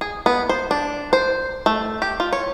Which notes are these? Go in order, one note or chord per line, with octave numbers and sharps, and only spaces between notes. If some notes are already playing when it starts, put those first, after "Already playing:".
G#4
B3
C5
D4
C5
A3
G4
F4
C#5